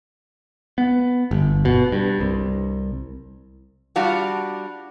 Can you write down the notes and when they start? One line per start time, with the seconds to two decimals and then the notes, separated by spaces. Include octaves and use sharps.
0.78 B3
1.31 G1
1.65 B2
1.92 G2
2.20 C2
3.96 G3 D4 F4 F#4